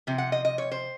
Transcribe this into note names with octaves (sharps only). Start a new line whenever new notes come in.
C3 F3
F#5
D#5
D#5
C#5
C5